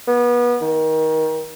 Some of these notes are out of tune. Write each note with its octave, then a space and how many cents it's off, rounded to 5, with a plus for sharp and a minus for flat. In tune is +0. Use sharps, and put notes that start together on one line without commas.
B3 -30
D#3 +25